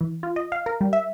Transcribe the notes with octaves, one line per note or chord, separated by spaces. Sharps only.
E3
F4
D#5
F5
A#4
G3
E5